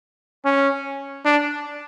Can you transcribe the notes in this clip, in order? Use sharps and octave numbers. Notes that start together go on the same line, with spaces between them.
C#4
D4